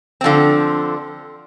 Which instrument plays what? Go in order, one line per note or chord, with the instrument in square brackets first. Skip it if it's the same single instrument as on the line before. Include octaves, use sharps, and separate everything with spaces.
[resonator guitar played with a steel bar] D3 F3 C4